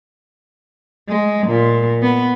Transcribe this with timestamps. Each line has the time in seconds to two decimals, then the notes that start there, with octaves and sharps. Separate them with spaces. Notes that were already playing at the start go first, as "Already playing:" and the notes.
1.09 G#3
1.47 A#2
2.02 B3